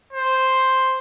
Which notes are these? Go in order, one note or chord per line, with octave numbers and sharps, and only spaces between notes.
C5